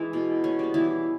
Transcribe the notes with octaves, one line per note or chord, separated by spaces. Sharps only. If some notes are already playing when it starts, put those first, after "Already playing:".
Already playing: E3 G#3 E4
B2
C#4
G3 B3
E3 E4